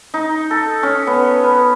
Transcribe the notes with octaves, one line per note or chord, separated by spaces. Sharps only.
D#4
A4
C#4
B3
B4